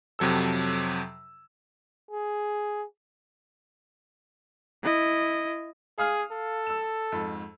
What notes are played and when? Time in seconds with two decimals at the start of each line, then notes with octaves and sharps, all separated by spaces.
0.19 F2 C3 F#3 A4 E6
2.11 G#4
4.83 E4 D#5
5.98 G#4 F5 D#6 F6
6.32 A4
6.66 E6 E7
7.12 F2 G#2